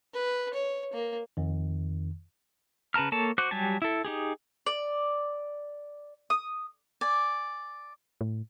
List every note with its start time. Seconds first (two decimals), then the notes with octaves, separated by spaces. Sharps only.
0.14 B4
0.54 C#5
0.93 A#3
1.37 F2 D#3
2.94 C#3 B4 A5 A#5 F6
3.12 A#3 A4 C#5 A5
3.38 F#4 C5 D6 F#6
3.51 F#3 G3 G4 G#5 A5
3.82 E4 A4
4.05 D#4 G4 G#4
4.66 D5
6.30 D#6
7.01 D5 G#5
8.21 A2